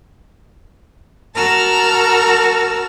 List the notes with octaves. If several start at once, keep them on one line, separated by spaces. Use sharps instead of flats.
F#4 A#4 A5 A#5 E6 F6